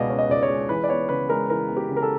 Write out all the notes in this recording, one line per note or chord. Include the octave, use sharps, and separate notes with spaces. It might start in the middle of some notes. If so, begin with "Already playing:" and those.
Already playing: C#2 B2 G#3 D5 D#5 F5
C#4
D#5
C#2 D5
C#5
G#3
E3 B4
D5
B3 C#5
C#3 B4
G#3 A#4
E3 A#4
B3
G4
C#3
A#4
A4